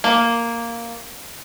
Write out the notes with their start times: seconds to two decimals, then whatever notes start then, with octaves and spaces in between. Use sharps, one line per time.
0.04 A#3